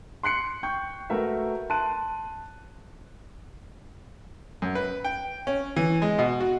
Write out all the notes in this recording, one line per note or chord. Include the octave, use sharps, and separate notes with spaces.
C6 F#6 C7 C#7
G5 C#6 G6
A3 F#4 A#4 B4 E5
A5 C6 F#6 D#7
F#2
B4
G5
C#4
E3
G#3
B2
F#4